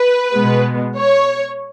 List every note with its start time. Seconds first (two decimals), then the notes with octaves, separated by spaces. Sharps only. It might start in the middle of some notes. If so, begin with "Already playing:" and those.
Already playing: B4
0.35 B2 G#3 B3
0.97 C#5